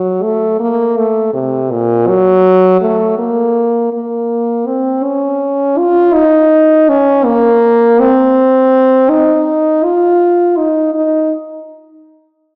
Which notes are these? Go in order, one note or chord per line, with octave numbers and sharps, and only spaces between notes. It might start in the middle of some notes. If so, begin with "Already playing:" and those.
Already playing: F#3
A3
A#3
A3
C3
A#2
F#3
A3
A#3
A#3
C4
C#4
F4
D#4
C#4
A#3
C4
D#4
F4
D#4
D#4